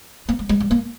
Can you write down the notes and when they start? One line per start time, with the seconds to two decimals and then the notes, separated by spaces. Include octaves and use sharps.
0.29 A#3
0.39 G#3
0.49 G#3
0.60 G3
0.71 A#3